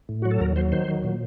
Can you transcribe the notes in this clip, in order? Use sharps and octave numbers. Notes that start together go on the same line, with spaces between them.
A2
F#3 F#4
A4
D#2 A#4
F#3 C5
D#3 C5
F#3
A#2